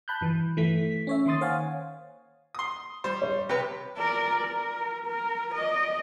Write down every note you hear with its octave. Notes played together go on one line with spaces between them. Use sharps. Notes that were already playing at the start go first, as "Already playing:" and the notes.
A5 B5 F#6 G6
G2 E3
E3 A3 B6
C#4 C#5 E5
D#3 A#3 C6 D#6 A6
C5 C#5 F5 F#5 G#5
C6 D#6
G3 C5
C#5
C3 G4 B4
A#4 D5
A#4
A#4
D5 D#5